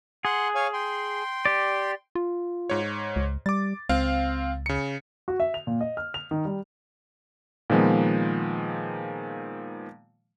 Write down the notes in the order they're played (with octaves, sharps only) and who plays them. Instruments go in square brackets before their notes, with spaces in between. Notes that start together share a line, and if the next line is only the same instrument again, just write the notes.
[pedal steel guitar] G#4 [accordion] F#5 C6
[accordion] C#5 F5 G#5
G5 C6
[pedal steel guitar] G4 D5
[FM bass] F4
[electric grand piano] G#2 C#5
[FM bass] C#2
[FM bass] G3 [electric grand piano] D6 A6
[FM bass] C#2 [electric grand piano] C4 F5 F6
[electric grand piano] C#3 C#7
[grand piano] F#4
E5
F7
A#2
D#5
F6
F7
D#3
G3
[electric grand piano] A#2 D#3 F3 G#3 B3